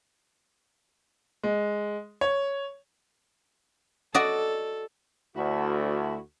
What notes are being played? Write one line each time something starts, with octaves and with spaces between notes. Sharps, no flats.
G#3
C#5
F#4 A4 D5 D#5
D2 E4 F#4